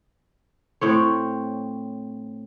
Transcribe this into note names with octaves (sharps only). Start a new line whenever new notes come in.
A2 C4 C#5